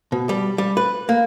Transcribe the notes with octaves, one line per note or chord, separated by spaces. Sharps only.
B2
G3
G3
B4
A#3